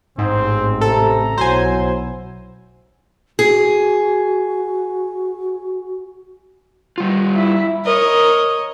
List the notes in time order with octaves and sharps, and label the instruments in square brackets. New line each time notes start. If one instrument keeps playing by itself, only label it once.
[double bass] A1 [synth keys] G#2 [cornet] C4
[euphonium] C3 [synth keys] A4 [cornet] A#5
[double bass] B1 E4 [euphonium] F#3 [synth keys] C5 G#5
[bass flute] F#4 [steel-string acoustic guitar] G#4
[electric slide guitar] G3 F4
[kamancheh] E4
[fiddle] A#4 [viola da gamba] C#5 D#5